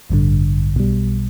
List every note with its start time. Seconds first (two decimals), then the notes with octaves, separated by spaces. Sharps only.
0.10 A1 G2 D3
0.75 B1 B2 G3